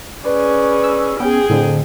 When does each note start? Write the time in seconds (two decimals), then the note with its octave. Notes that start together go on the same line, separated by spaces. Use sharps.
0.25 C#4 G#4 B4 D5
0.84 E6
1.20 B3 C#4 G#4 G5
1.50 F2 A2 D3